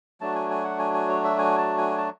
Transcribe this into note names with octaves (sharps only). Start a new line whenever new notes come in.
F#3 A3 D4 F#4 A5
G#5
G#5
F#5
G#5
G#5
C#5
E5
G#5
A5
G#5
A5